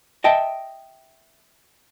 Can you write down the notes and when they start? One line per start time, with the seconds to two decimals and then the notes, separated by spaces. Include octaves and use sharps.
0.24 D#5 E5 G5 A5